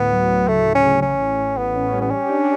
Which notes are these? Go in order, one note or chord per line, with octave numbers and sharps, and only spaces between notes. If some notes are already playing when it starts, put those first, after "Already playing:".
Already playing: D2 A2 B3
F#3
F#3
C#3 A3
D2
C#4
C#3
A1 C#4
A2
A2
A1 B3
C#4
G3
B3
C#4 G4
D4